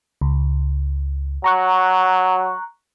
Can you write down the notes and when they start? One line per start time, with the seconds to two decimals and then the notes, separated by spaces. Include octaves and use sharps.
0.21 C#2
1.44 F#3 A#5 C#6 F#6